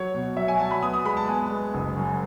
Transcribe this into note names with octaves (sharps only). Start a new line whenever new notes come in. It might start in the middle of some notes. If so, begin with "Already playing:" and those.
Already playing: F#3 C#5
B2
F#3 E5
G#5
F#3 A5
B5
B3 D#6
D#6
G#3 B5
A5
B3 G#5
G#3
F#1
F#2